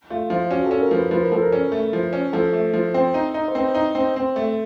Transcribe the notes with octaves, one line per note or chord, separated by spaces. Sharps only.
A3 F4
F3 F4
C#4 F#4
A4
C#4
A#4
F3
B4
F3 B4
A#4
F3 A4
A#4
C#4
A3
F3
C#4
F3 A4
A3
F3
C4
D#4
D#4
C5
C4 B4
D#4
C4
C4
A3